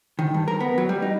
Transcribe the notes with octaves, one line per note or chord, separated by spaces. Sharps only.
D#3
G2
A#4
B3
F#3
G3
D#4